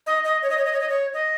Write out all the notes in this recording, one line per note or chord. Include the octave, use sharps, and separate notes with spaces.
D#5
D#5
C#5
D#5
C#5
D#5
C#5
D#5
C#5
D#5